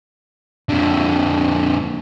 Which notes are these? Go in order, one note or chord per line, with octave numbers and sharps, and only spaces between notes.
F2 D3